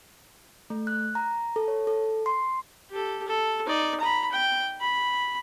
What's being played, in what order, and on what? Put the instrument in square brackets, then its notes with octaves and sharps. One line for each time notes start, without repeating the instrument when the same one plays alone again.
[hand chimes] A3
F#6
A#5
A4
C#5
A4
C6
[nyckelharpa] G4 A4
A4
D#4 D5
A#5 B5
G5
B5